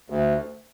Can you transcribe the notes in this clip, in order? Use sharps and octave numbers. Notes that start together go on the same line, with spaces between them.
D2